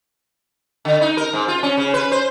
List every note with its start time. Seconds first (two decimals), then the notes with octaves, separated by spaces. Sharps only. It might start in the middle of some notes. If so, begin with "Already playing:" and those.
0.85 D3
1.01 D#4
1.17 A#4
1.33 G#2
1.48 F4
1.63 C#4
1.77 C#3
1.94 B4
2.12 C5